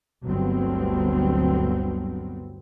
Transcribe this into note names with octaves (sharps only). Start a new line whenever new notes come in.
G1 D2 G2 F#3 B3 C4